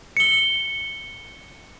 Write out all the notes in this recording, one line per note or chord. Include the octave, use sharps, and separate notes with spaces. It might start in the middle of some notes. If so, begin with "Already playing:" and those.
C#7 G7